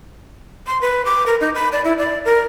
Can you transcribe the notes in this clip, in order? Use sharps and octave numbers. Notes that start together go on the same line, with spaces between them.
C6
B4
D6
A#4
D#4
B5
D5
E4
D5
A#4